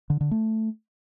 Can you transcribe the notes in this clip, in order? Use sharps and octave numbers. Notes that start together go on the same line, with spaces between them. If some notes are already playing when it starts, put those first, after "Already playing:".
D3
D3
A3